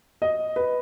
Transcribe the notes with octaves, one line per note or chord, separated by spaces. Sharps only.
D#5
B4